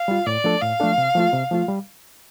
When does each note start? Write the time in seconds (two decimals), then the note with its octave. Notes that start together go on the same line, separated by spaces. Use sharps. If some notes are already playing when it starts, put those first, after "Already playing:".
Already playing: F5
0.08 G3 F4
0.26 A2 D5
0.44 F3 A3 D4 A4
0.62 A2 F5
0.80 F3 A3 D4 A4
0.98 C3
1.15 F3 A3 F4
1.33 C3
1.51 F3 A3 F4
1.68 G3